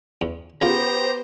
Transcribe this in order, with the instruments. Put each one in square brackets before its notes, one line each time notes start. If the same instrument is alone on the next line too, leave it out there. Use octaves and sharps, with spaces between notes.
[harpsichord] E2
[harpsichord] C#3 F4 [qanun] B3 [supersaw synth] G4 C5 [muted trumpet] A#5